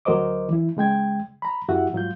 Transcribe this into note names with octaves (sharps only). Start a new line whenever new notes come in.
D2 F#3 A#4 C5 D#5 D6
E3 E4
C#3 G#3 G5 G#6
A#5 B5
F#2 E4 F#4 G4 E5 F#5
G#2 F#3 F4 G6